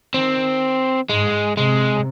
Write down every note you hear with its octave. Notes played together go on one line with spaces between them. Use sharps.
D#3 C4
G#2 G#3
C3 G#3